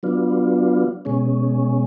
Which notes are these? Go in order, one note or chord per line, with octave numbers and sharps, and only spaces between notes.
F#3 B3 D4 F4
B2 G#3 C#4